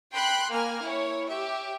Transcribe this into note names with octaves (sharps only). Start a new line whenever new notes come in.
G5 B5 C6 F#6
A#3 G#5 F6
E4 C#5
G4 E5